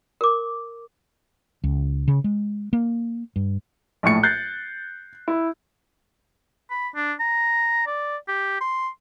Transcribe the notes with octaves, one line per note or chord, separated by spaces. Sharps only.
A#4 D6
C#2
C#3
G#3
A#3
G2
A#1 A2 C#6 C#7
F#6 G6 A6 C7
E4
B5
D4
A#5
D5
G4
C6